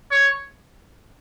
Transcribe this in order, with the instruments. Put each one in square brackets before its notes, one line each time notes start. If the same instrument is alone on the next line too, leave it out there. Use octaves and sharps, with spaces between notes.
[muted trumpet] C#5